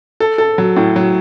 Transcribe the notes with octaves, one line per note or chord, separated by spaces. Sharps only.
A4
A4
F#3
A2
F#3